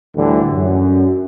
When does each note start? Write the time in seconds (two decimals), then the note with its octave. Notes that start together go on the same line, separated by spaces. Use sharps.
0.15 D2 A2 D3 E3 G3
0.52 F#2